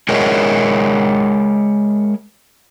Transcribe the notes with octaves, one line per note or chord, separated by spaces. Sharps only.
G#3 G#4 A#4 C#5 D#5 E5